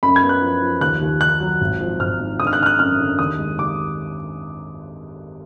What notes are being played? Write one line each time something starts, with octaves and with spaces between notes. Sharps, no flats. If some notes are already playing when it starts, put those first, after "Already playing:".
F#2 B5
G#6
B3
F#6
F3
F3
D#2 F#6
D#2
D#2 F#6
F#3
G#1
F3
G#1 F6
G#2
D3 D#6
F6
F#6
D3 F6
F#6
F#2 F6
D3
D#2 D#6
G#3
D#2 D6